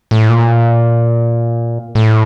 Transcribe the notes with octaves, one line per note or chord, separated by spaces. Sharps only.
A2
A#2
A2